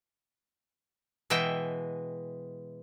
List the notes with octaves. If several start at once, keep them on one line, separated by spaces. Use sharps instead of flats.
B2 E3 G#3 E5 G5